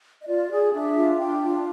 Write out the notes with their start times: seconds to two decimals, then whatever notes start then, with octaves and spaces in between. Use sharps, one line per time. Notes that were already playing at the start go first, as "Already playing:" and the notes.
0.20 D#5
0.27 F4 D5
0.50 G#4
0.73 D4 E5
0.96 F4
1.18 D4 G5
1.42 F4